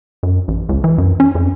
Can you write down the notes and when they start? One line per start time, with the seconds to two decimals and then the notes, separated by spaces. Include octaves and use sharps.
0.23 F#2
0.48 A1
0.69 C#2
0.84 E3
0.98 F#2
1.20 C#4
1.35 F2